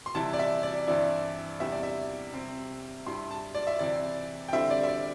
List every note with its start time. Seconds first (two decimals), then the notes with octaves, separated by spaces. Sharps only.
0.06 C6
0.15 C3 E3 G3 E4 A5
0.33 D5
0.39 E5
0.63 D5
0.87 G2 E3 C4 E4 D5
1.60 E2 C3 G3 D4 E5
1.72 D5
1.83 E5
2.33 C3 G3 C4
3.06 G2 G3 E4 C6
3.31 A5
3.55 D5
3.67 E5
3.79 C3 E3 C4 E4 D5
4.48 G5
4.53 D3 G3 C4 E4 E5
4.70 D5
4.83 E5
4.89 D5